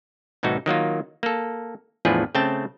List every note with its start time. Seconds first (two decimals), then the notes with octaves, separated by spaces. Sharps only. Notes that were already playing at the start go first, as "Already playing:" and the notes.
0.43 C2 A2 E3 D#4 F#4
0.66 D#3 F#3 A#3 F4
1.23 A#3 A4
2.05 E2 A2 F3 D4 G#4 B4
2.35 C#3 A3 C4 G5 A5